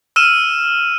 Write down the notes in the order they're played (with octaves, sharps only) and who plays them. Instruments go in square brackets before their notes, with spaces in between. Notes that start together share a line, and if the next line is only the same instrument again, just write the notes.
[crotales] E6 F6 D#7 E7